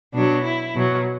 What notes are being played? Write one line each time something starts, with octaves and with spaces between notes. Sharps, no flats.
B2 F#3 D4
E4
B2 F#3